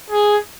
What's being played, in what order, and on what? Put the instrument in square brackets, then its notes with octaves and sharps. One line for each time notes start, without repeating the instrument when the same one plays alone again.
[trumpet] G#4